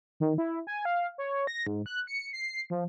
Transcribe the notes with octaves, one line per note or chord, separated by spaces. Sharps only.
D#3
E4
G#5
F5
C#5
A#6
G#2
F#6
C#7
C7
F3